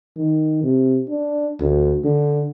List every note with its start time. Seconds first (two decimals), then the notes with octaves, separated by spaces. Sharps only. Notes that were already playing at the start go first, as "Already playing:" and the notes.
0.17 D#3
0.63 C3
1.09 D4
1.60 D2
2.04 D3